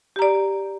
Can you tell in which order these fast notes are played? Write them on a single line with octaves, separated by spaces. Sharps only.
G4 A#5 D5